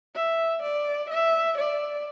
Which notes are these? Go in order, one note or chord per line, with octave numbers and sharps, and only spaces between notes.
E5
D5
E5
D5